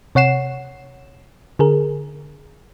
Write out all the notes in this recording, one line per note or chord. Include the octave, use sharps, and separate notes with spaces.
C3 C#5 F#5 C7 E7
D3 G#4 A#4